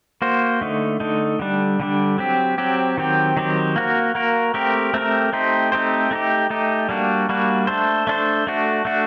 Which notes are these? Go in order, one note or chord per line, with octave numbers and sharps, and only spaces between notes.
A#3 F#4 C5
D3 A3 D#4
D3 A3 D#4
D3 G3 D4
D3 G3 D4
F#3 C4 G4
F#3 C4 G4
D#3 F#3 C4 G4
D#3 F#3 C4 G4
A#3 F#4 A#4
A#3 F#4 A#4
A3 C4 G4 A#4
A3 C4 G4 A#4
A3 C4 D#4 G4 C5
A3 C4 D#4 G4 C5
A3 D#4 G4
A3 D#4 G4
G3 A#3 D4 F#4
G3 A#3 D4 F#4
A3 D4 A4 C5
A3 D4 A4 C5
A3 D4 F#4
A3 D4 F#4